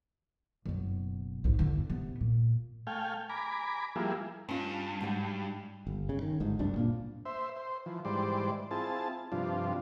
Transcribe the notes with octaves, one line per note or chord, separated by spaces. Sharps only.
F#1 B2
C2 G#2
E2 D3
C3 B3
A#2
A3 F5 G5 G#5
G#5 A#5 B5 D6
F3 G3 A#3 E4 G#4
G2 C#4 F4
G#2 F#3 G3
G1
C#3
D#3
G1 G#2
F#1 C2 G2 D4
A#2 A#3
C5 E5
C5
E3 F3
G#2 E3 G3 C5 D5
C4 E4 F4 G#4 A5
G2 C3 F3 D4 F4